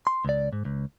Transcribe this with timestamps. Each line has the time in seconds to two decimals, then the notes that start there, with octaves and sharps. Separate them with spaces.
0.07 C6
0.25 C#2 D5
0.53 G#2
0.65 C#2